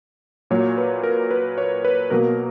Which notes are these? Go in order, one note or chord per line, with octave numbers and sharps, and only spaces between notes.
A#2 F#3 A#3 C#5
B4
A#4
B4
C#5
B4
B2 F#3 A#3 A#4